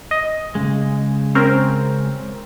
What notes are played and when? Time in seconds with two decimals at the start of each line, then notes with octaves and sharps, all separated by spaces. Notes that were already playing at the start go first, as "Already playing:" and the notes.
0.11 D#5
0.55 C#3 G#3
1.35 C4 C#4 A#4